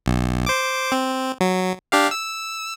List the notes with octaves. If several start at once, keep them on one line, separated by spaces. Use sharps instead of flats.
B1
C5 D6
C4
F#3
D4 G4 F5
E6